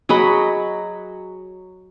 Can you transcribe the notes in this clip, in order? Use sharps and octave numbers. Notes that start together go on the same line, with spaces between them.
F#3 G#4 D#5 B5